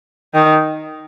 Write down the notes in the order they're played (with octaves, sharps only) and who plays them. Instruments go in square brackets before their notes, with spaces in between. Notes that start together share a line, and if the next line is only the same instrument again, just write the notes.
[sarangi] D#3